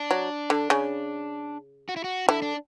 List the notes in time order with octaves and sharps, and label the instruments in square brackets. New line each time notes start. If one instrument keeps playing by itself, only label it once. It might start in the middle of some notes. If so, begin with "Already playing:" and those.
Already playing: [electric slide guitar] D4
[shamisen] F#3
D3
C#3
[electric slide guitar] F#4
E4
F#4
[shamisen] D3 [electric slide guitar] E4
[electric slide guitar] D4